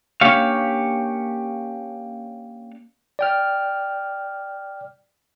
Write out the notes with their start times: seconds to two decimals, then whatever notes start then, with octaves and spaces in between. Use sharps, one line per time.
0.21 A#3 C#4 D4 G4 C#5 F5
3.19 D5 G5 F6